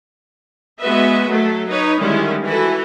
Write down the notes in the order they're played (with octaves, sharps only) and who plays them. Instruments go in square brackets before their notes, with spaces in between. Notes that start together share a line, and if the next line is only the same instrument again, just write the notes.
[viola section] G#3 B3 F#4 B4 D#5 E5
F#3 A3 A4
D#4 B4 C#5
D3 D#3 G3 G#3 C#4 E4
E3 E4 F#4 A4